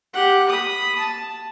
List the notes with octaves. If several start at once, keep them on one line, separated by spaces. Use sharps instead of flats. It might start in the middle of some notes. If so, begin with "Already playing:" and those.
G4 F#5
B5 D#6
A5